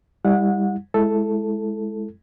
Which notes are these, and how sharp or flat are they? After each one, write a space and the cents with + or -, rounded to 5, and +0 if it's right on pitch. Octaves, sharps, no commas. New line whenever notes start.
G3 +20 E4 -25 F#5 -30
G#3 +15 E4 +0 A4 +0